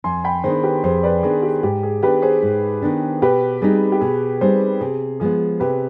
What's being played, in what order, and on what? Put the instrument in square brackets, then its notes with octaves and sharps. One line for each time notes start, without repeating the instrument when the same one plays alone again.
[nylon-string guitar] F2 [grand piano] G#5 C6
[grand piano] G5 B5
[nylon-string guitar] D#3 B3 D4 [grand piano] G#4 C5
[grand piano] G4 B4
[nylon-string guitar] F2 [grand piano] G#4 C5
[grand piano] B4 D5
[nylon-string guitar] D#3 B3 D4 [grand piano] G#4
[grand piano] G4
[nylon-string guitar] G#2 [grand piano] G4
[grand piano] G#4
[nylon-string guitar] D#3 B3 D4 [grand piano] G4 B4
[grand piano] G#4 C5
[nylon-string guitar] G#2
D#3 B3 D4
[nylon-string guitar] B2 [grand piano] G4 B4
[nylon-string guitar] G3 C4 D#4 [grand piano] G#4
[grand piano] G4
[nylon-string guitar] B2 [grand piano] G#4
[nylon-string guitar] G3 C4 D#4 [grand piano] G#4 C5
[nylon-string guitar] C3 [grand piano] G#4
[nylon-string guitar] F3 G#3 B3 [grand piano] G#4
[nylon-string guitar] C3 [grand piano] G4 B4